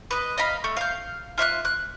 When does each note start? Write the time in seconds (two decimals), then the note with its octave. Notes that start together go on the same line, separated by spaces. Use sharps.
0.11 B4 D#5
0.38 D#5 F5 B5
0.64 A3
0.77 F5 G6
1.38 F4 E5 F6 F#6
1.65 F#6